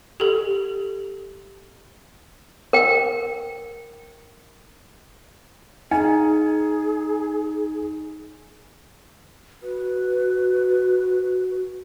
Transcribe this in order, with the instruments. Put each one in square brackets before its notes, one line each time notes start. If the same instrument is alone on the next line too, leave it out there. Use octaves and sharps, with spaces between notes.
[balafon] G4 A4
[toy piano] A#4 G5
[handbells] D#4 [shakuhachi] G#4 [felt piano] G#5
[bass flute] F#4 [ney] B4